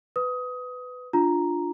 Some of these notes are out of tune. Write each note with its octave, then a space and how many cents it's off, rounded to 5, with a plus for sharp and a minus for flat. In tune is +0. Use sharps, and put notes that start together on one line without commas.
B4 +15 D#6 +20
D4 +0 F4 +0 A#5 +0